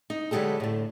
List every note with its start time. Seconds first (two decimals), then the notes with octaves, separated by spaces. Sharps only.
0.10 D#4
0.31 D3 F#3 G#3 B3 G4 A4
0.60 A2 D3